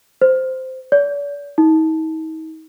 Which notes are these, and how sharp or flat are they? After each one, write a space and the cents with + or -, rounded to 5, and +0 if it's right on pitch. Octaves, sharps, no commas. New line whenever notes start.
C5 -10
D5 -45
D#4 +40